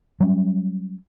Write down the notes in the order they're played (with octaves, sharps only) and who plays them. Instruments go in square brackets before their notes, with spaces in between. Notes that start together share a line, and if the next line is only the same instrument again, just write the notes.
[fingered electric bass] F#3 G3 C#4